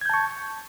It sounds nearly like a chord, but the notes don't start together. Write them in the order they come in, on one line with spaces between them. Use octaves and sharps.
G#6 G6 A5 C#6